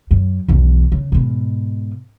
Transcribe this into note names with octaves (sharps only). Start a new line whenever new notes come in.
F#2
B1 E2
C#3
G#2 B2